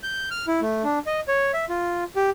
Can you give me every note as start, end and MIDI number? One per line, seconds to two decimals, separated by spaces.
0.03 0.29 91
0.31 0.46 89
0.47 0.61 64
0.61 0.83 57
0.84 0.99 62
1.06 1.20 75
1.28 1.52 73
1.53 1.65 76
1.69 2.04 65
2.16 2.30 67